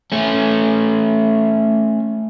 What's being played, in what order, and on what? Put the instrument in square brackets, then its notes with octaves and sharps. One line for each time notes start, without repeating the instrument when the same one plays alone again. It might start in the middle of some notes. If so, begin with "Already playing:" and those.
[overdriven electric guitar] A3 C#4